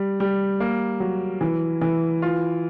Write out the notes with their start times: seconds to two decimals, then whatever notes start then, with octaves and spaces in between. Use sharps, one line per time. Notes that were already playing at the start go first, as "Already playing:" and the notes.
Already playing: G3
0.20 G3
0.60 A#3
1.00 F#3
1.41 E3
1.81 E3
2.22 F4